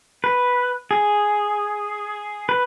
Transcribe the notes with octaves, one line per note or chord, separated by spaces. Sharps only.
B4
G#4
B4